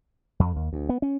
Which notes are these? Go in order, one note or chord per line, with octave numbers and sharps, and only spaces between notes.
F2
D#2
D2
B3
C#4